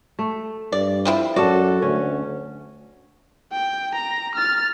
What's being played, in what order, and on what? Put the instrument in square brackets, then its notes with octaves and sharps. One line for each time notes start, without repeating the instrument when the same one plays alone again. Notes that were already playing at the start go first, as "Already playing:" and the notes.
[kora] A3
[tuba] G2 [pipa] D5
[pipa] F3 C4 E4
[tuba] F#2 [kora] F#4 A4 [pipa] D5
[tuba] D2 [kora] C#4
[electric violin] G5
A#5
F6 A6